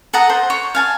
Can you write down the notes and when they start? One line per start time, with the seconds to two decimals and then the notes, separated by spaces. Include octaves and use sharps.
0.13 A4 F#5 A#5 D#6
0.30 C5
0.50 C#5
0.75 F5 G#5 A5